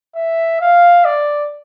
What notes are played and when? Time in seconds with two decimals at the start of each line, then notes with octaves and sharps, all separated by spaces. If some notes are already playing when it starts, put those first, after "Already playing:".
0.15 E5
0.61 F5
1.05 D5